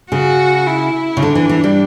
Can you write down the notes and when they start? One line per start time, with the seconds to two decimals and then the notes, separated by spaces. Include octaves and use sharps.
0.11 C#3 F#4
0.66 E4
1.17 C#3
1.22 D3 D4
1.35 E3
1.49 E3
1.64 G3